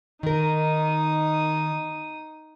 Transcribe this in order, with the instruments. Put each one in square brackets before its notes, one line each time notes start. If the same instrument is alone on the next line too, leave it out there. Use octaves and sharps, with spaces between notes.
[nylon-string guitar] D#3 A#4 [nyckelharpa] D#4 D#6